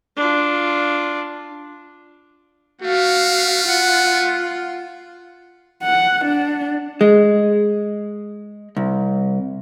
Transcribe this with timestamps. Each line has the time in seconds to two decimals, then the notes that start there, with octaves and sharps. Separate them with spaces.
0.16 D4 F4
2.82 A3 F#4 F5
3.68 F4 F#5
5.83 F#5
6.25 D4
7.01 G#3
8.77 C2